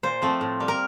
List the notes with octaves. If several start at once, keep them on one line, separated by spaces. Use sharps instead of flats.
A#2 C5
F3 A3 C4
A2
G3 A#3
A#4